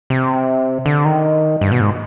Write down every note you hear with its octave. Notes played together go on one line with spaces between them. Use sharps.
C3
D3
D#3
G2
B2
G#2